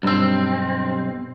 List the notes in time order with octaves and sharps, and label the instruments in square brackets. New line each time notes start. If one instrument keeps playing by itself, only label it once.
[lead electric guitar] B1 C4 [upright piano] G2 E6